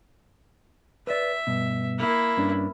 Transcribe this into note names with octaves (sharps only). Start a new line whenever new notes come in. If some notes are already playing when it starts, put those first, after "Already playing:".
B4 D5 E5
G2 B2
A#3 E4
G2 C#4 D4